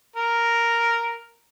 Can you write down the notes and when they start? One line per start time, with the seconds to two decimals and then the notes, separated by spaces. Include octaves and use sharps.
0.16 A#4